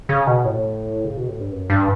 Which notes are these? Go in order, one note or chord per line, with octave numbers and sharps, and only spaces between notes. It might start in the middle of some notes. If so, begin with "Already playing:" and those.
C#3
B2
A2
C#3
B2
A2
G2
F#2
G2